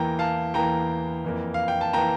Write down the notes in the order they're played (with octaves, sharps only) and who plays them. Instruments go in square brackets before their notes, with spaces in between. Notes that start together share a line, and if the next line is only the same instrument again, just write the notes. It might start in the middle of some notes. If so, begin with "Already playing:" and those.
Already playing: [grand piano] E2 E3 A#3 G5 A#5
F5 A5
E2 E3 A#3 G5 A#5
F2 E3 A#3
F5
G5
A5
E3 A#3 G5 A#5